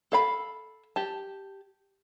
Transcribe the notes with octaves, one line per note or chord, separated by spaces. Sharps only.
A4 F5 B5
G4 A5